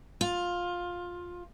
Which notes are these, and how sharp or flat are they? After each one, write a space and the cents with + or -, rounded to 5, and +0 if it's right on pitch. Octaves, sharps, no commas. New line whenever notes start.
F4 +15